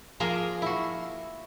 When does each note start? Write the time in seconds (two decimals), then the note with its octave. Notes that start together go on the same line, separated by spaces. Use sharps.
0.20 F3 A#3 F4 G#4 A#4 A#5
0.62 E4 F#4